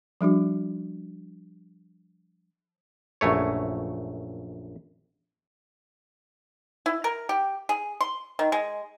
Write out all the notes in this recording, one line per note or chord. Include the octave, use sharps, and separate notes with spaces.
F3 G3 D4 F#4
A#1 F#2 A3 C#5
E4
A#4
G4
G#4
C6
D#3
G#3